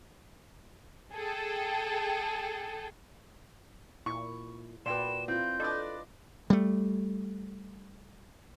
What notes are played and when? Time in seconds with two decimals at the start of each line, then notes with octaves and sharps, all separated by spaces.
1.13 G#4 A4 G5
4.06 A#2 E4 C#6
4.86 A#2 F#4 B4 D5 G5 C6 E7
5.28 C4 E4 F4 G6
5.60 D4 A4 B4 D5 D#5
6.50 G3 A3